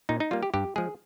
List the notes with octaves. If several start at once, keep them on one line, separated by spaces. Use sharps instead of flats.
A#2 D#4
D#4
G3 A#3 F4
G4
G2 G4
F3 G#3 G#4